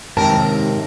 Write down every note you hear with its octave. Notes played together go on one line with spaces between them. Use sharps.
D#2 G#2 C3 D#4 A#4 A5